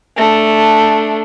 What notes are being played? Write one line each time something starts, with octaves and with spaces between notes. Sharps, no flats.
A3 D4